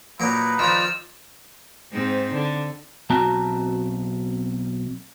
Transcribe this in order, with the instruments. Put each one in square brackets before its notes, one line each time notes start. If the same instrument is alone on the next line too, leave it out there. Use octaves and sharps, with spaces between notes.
[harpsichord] A#2 F#3 A#3 [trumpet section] D#4 B4
[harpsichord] D#3 F3 [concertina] F4 D5 [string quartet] E6 F6
[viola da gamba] G#2 C4 D#4
D3
[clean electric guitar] B1 B2 C4 F#4 A5 A#5